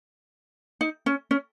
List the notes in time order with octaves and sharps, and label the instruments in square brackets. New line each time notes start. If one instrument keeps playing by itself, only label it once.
[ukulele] D#4
C#4
C#4